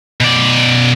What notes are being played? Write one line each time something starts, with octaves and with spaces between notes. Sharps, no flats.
B2 D5